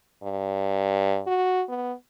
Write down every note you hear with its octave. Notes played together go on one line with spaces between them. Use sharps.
G2
F#4
B3